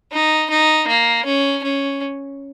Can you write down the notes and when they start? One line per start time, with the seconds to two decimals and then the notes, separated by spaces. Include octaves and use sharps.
0.12 D#4
0.50 D#4
0.88 A#3
1.25 C#4
1.63 C#4